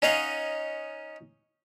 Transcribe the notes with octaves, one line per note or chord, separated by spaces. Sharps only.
C#4 D#4 C#5 D#5 F5 F#5